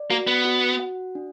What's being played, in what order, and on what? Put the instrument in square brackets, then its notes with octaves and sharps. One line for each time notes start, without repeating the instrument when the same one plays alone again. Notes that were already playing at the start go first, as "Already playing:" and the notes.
Already playing: [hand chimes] D5
[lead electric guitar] A#3 [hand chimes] F#4
[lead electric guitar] B3
[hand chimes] F#4
F#5
D4